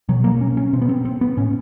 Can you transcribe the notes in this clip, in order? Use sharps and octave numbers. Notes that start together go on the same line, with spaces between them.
B2 F#3
A#3
C#4
C#4
B2 C4
B3
C4
C4
B3
A2 C#4